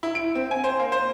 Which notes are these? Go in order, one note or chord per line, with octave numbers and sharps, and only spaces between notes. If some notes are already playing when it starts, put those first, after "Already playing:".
E4
D7
C4
G#5
C5
A#3
C5